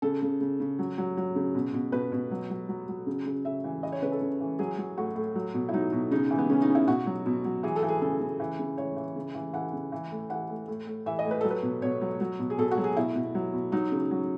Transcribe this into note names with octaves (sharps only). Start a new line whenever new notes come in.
C#3 A4
C#3
C#3
C#3
F#3
F#3
F#3
C#3
B2
B2
B2 B4
B2
F#3
F#3
F#3
F#3
C#3
C#3
C#3 E5
E3
E3 D#5
C#5
C#3 B4
A4
C#3
E3
F#3 G#4
F#3
A2 F#4
A2
F#3
B2
E4
F#3 D#4
B2
C#3 D#4
E3
B3
C#3 C#4
D#4
C#3
E4
B2 F#4
F#3
B2
F#3
E3 G#4
A4
E3
G#4
C#3 A4
C#3
E3
C#3
E3 C#5
E3
C#3
E3
E3 F#5
C#3
E3
A2
E3 F#5
A2
A2
A2
E3 E5
D#5
A2
B4
F#3 A4
B4
B2
B2 C#5
F#3
F#3
B2
G#4
B2 A4
F#4
F#3
G#4
B2 E4
B2
F#3
B2
F#3 D#4
C#3
F#3